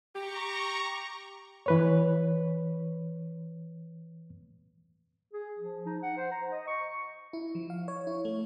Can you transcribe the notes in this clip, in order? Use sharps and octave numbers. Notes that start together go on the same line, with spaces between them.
G4 A#5 C#6
E3 B4 C#5
G#4
F3
D#4
F#5
C5
A#5
D#5
C#6
E4
F3
F5
C#5
E4
A3